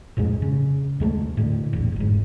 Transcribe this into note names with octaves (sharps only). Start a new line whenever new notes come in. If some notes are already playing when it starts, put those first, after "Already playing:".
A#1 F2 A2 G#3
C#3
D#2 G#3 A3
A2 D3
E1 A#1
F1 G#2